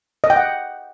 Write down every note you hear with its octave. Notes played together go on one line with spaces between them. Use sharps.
D#5
G5
F#5